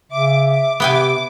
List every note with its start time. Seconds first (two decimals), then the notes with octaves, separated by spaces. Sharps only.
0.12 C#3 E5 D6
0.49 D6
0.80 C3 B3 E5 G5 G#5 D6